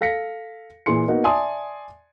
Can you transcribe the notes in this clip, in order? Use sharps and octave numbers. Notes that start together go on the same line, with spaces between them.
A4 F5 A#6 B6 C#7
A#2 E3 G#4 C6 C#7
A#3 B3 D#4 F#4
D5 E5 G#5 A5 C6 D#6